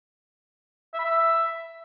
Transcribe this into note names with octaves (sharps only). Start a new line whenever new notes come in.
E5
B5
E5